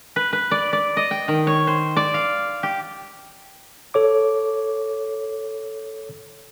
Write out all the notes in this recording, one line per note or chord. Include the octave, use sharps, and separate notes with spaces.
B4
B4
D5
D5
D#5
G5
D#3
C#5
C5
D5
F5
G4
A4 C#5 D6